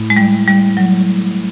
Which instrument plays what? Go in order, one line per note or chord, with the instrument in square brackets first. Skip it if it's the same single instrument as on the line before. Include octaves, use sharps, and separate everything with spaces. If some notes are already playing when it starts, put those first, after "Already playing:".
Already playing: [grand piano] A2
[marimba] G#3
G3
G3
F#3